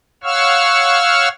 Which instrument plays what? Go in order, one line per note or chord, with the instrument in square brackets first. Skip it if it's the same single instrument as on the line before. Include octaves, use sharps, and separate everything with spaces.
[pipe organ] C#5 F5 F#5 C#6 E6 F6